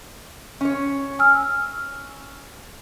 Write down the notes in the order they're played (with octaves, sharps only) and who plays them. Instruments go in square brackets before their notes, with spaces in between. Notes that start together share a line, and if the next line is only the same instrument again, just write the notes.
[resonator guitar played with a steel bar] C#4 C#5
[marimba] G#5 E6 F6